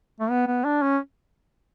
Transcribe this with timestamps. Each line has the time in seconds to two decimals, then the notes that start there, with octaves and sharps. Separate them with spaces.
0.20 A3
0.30 B3
0.47 B3
0.65 D4
0.82 C#4